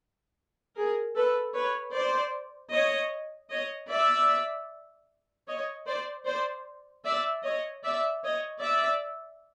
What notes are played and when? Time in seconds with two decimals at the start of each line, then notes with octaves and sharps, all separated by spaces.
0.76 G#4 A#4
1.16 A4 B4
1.55 B4 C#5
1.94 C5 D5
2.72 C#5 D#5
3.51 C#5 D#5
3.90 D5 E5
5.47 C#5 D#5
5.87 C5 D5
6.26 C5 D5
7.05 D5 E5
7.44 C#5 D#5
7.84 D5 E5
8.23 C#5 D#5
8.62 D5 E5